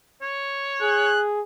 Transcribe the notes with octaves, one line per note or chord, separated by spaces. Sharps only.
C#5
G#4 F#6